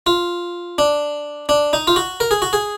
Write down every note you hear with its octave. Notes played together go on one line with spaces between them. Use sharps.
F4
D4
D4
D#4
F4
F#4
A#4
G#4
F#4
G#4